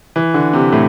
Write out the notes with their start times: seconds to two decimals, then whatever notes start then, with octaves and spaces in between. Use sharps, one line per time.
0.16 E3
0.34 D3
0.53 C3
0.72 A2